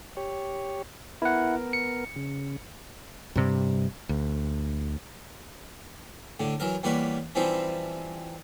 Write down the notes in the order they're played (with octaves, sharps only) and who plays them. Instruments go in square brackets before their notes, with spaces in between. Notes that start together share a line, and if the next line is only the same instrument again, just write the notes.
[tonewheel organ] G4 C#5
[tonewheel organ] B3 A#4 [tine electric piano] E4 F#5
[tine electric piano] C#7
[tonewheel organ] C#3
[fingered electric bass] G2 C3 G3
D2
[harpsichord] A2 D3
E3 F#3 A#4
E2 G3 A#3 B4 C#5
E3 F3 G3 C4 D#4 E4